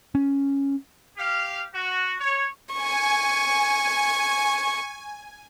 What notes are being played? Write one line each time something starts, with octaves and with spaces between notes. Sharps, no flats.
C#4
G4 F5
F#4
C#5
G#5 C#6